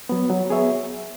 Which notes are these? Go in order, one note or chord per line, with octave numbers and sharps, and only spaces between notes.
F#3 B3
F#3
B3 G#4 C#5 E5